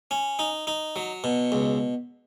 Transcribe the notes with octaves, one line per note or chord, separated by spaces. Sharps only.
C#4
D#4
D#4
F#3
B2
C#2